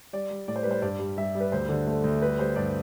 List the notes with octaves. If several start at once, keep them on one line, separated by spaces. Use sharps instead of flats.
G3 D5
G3
A2 D5
C5
G3 B4
C5
G2 D5
G3
G3 E5
G3
B4
D2 C5
D3
A3
D2
G3 B4
G3 C5
G2 D5